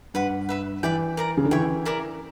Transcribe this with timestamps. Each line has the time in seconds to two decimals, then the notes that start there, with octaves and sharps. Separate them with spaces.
0.14 G2 B4 F#5 B5
0.49 B4 E5 B5
0.83 E3 B4 D5 G5
1.17 A#4 D5 A#5
1.37 C#3
1.44 D3
1.51 E3 C#5 E5 G5
1.85 E4 A#4 D5 A#5